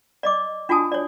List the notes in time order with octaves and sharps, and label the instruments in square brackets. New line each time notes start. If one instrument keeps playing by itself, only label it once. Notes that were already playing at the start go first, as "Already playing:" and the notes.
[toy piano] D5 D#5 D6
D4 F4 F#4 G#5 A5 D#6
C#5 D5